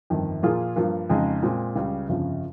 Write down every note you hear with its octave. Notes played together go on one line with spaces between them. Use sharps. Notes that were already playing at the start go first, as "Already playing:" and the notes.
G1 F2 D#3
A#2 F3 A#3 F4 G#4
G2 F3 A#3
F2 C#3 G#3 D#4
A#2 G#3 C4
C#2 C#3 G3
G1 F2 C#3 F3